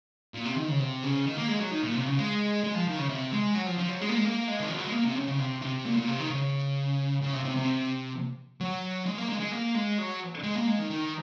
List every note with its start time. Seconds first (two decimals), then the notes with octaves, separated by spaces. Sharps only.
0.34 A#2
0.46 C3
0.57 D#3
0.69 C#3
0.80 C3
1.03 C#3
1.26 D#3
1.37 A#3
1.49 G#3
1.60 F#3
1.71 D#3
1.83 A#2
1.95 C3
2.06 C#3
2.18 G#3
2.64 G#3
2.75 F3
2.87 D#3
2.98 C#3
3.09 C3
3.32 G#3
3.55 F#3
3.67 F3
3.79 F3
3.89 F#3
4.01 G#3
4.09 A#3
4.16 G#3
4.25 A#3
4.48 G#3
4.60 D#3
4.69 F3
4.77 F#3
4.85 G#3
4.93 A#3
5.04 C3
5.16 C#3
5.28 C#3
5.39 C3
5.62 C3
5.85 A#2
5.97 A#2
6.08 C3
6.20 D#3
6.31 C#3
7.22 C#3
7.33 C3
7.45 C3
7.56 C3
8.61 F#3
9.06 G#3
9.18 A#3
9.29 G#3
9.40 G#3
9.51 A#3
9.74 G#3
9.98 F#3
10.43 G#3
10.56 A#3
10.67 G#3
10.79 D#3
10.90 D#3